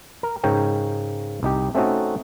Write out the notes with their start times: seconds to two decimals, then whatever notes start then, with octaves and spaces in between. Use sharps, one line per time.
0.23 A#4
0.44 G#2 C#3 A#4 C#5 G5
1.43 C2 D#4 G4
1.75 A3 C4 C#4 D#4 F#4 A4